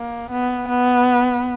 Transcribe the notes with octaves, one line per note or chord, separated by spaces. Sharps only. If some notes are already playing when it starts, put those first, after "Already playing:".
Already playing: A#3
B3
B3